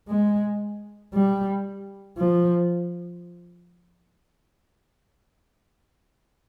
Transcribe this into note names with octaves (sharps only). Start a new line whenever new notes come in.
G#3
G3
F3